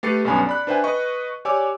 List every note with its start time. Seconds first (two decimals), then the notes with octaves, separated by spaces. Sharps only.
0.03 A3 G4 B4 A6 C7 C#7
0.25 B1 G2 B3 C#4 G#5 B5
0.47 D5 B5 F#6
0.67 D4 B4 C5 E5 G5 G#5
0.84 B4 D#5 C#6
1.45 G4 C#5 D5 G#5 D6 E6